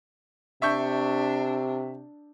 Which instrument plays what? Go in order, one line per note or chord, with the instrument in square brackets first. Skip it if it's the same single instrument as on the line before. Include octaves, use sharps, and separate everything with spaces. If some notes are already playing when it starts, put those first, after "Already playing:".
[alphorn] C3 [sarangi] D4 [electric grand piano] E5 C#6 G6